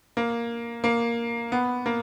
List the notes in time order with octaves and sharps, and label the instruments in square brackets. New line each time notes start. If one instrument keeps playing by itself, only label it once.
[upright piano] A#3
A#3
B3
A#3